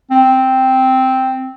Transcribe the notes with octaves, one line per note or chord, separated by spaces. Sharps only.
C4